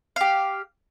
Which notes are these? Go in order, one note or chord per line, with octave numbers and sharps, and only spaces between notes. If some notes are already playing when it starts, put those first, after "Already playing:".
G4 F5